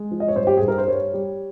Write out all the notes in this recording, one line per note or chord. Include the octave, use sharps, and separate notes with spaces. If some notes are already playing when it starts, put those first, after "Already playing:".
Already playing: G#3
F3
D#5
C#5
G2 C5
G4
G2 G#4
A#4
C5
G3 C#5
G3